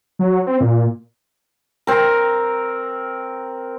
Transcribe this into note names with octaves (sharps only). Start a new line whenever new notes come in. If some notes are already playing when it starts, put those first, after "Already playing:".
F#3
C4
A#2
C4 A#4